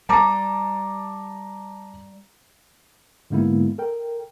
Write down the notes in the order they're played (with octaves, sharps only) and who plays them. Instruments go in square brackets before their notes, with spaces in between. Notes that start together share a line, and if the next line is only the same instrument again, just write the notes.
[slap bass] G3 [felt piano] A5 A#5 D6
[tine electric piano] G#2 D3 G#3 A#3 B3 E4
A4 A#4 G5